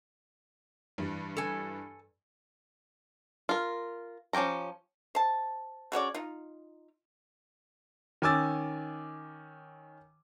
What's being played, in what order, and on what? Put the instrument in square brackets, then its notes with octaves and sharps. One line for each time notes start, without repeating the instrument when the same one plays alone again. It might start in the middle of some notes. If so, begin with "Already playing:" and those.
[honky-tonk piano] G2 E3 G3
[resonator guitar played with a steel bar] A4 G#5
[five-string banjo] F4 A#4
F3 C#4 G4 G5 A#5
[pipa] C5 A5
C#3 F#4 C#5 D5
D#4 F4
[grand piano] D#3 C#4 G#5 D6 E6 A6